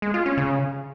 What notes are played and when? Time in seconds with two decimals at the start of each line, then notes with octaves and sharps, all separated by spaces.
0.02 G#3
0.14 F4
0.26 C#4
0.38 C#3